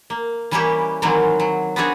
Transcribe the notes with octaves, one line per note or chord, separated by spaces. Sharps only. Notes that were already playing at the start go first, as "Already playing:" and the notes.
A#3
E3 G3 A#3 C#4 E4 G4
D#3 E3 F#3 G#3 A#3 C4
F#3
B3 C4 D4 F#4 G#4 C#5